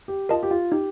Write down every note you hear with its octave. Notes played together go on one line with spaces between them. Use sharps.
G4
F4 A#4 D#5 A5
G4
F4
D#4 G4